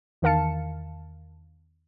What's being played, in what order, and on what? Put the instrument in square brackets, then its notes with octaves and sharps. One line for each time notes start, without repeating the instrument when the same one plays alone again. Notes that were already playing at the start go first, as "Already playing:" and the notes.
[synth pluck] E2 D#3 A#4 F5 A5 C#7